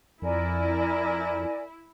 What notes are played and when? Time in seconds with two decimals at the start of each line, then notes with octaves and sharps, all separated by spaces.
0.22 F2 E4 A#4 D5 G#5